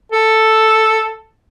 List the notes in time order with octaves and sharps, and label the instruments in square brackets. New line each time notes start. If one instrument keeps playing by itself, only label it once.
[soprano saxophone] A4